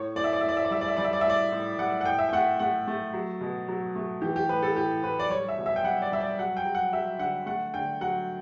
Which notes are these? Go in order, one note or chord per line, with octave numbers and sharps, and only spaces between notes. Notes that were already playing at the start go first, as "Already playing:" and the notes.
Already playing: A2 C#5
A2 D5
E5
D5
A2 E5
D5
E5
D5
G3 E5
D5
E5
G3 D5
E5
D5
A2 E5
D5
A2
G3 F#5
F#5
A2 G5
E5
G5
A3 F#5
A3 F#5
A3
F#3
B2
F#3
A3
E3 G4
G4
A2 B4
A4
A2 G4
A2 B4
D5
G3 C#5
E5
B2
E5
G5
G3 F#5
D5
G3 E5
D5
F#3 F#5
G5
F#3
F#5
F#3 E5
D3 F#5
A3 F#5
D3 G5
F#3 F#5